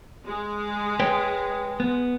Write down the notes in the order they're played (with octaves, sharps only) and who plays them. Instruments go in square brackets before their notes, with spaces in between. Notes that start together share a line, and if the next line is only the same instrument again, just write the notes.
[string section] G#3
[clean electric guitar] B4 C#5 G5
B3